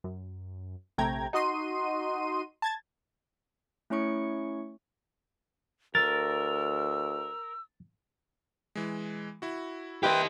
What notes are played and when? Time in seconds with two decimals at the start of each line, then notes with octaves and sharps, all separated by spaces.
0.04 F#2
0.98 A#1 C3 A3 G5 A#5 G#6
1.33 D#4 F#4 D#5 C6 D#7
2.62 A5 G#6 A6
3.90 A3 C#4 E4 C#5 C#6 C#7
5.95 D2 A#4 E6 A6
8.75 E3 G#3
9.42 E4 F#4
10.03 E4 G4 B4 C5 D#5 G5